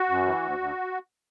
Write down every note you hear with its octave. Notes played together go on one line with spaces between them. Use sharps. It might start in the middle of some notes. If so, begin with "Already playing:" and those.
Already playing: F#4
F#2
E3
D2
D2